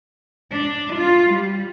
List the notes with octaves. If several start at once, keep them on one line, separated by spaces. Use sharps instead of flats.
D4
F4
G3